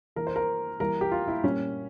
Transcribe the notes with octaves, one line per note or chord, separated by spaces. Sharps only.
E3 A#3 A#4
C5
A#4
E3 G3 A#3 A#4
G4
F4
E4
A#2 G3 A#3 C#4